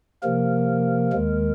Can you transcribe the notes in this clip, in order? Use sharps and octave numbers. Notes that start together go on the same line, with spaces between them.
C3 F3 A#3 A#4
D#2 D#3 G#3